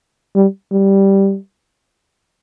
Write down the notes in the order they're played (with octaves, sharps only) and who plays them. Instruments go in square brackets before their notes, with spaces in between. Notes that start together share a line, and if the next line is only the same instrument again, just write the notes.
[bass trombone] G3
G3